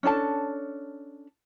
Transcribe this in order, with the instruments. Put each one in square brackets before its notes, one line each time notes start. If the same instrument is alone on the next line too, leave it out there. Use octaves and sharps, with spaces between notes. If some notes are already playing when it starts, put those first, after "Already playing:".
[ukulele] C#4 D4 A4 A5